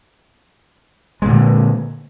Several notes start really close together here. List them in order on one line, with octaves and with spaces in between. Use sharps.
G#3 A#2 D3